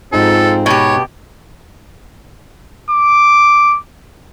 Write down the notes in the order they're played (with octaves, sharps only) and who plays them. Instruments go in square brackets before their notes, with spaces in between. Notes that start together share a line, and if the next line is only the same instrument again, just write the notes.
[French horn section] F2 C4 F4 [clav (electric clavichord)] G#2 D#4 G#5 [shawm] A4
[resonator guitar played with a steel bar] B2 G4 [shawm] C#5
[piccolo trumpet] D6